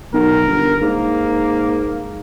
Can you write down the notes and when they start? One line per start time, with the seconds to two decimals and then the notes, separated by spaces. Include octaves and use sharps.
0.14 B1 A#4
0.47 G1
0.82 G#2 A#3